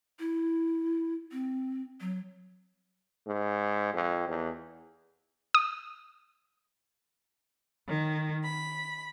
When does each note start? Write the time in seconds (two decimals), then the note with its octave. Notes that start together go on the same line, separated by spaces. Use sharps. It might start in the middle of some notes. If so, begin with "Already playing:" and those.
0.19 E4
1.32 C4
2.01 F#3
3.27 G#2
3.93 F2
4.28 E2
5.54 D#6
7.87 D#3
8.44 B5